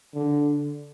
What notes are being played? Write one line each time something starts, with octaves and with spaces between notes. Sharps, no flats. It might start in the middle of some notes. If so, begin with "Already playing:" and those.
D3